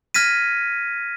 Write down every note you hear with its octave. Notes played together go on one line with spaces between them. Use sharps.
F6 G#6 A#6 B6 D#7